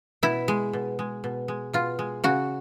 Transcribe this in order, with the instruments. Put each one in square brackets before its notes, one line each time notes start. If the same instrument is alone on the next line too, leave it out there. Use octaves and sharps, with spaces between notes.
[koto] B2 E4
G#3
B2
G#3
B2
G#3
B2 F4
G#3
C#3 F#4